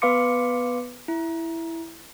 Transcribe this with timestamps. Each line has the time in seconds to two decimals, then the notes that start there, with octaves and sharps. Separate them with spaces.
0.02 B3 B4 F5 C6 D6 C#7
1.08 E4